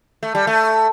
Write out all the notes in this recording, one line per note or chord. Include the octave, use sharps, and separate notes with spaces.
A3
G3
A3